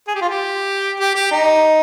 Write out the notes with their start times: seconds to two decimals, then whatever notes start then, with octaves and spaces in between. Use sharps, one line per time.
0.08 G#4
0.15 G4
0.21 F4
0.29 G4
1.00 G4
1.15 G4
1.31 D#4